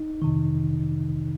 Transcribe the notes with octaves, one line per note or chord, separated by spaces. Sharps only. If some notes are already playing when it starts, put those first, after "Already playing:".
Already playing: D#4
F2 C3 D#3